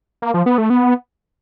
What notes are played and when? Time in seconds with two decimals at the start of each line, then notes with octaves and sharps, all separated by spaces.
0.22 A#3
0.34 F3
0.46 B3
0.58 A3
0.70 B3